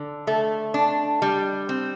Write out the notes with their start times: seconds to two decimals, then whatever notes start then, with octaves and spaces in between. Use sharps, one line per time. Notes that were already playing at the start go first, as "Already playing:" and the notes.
Already playing: D3
0.27 A3
0.74 D4
1.22 G3
1.69 C4